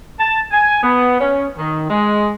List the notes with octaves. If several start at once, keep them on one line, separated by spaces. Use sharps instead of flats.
A5
G#5
B3
C#4
D#3
G#3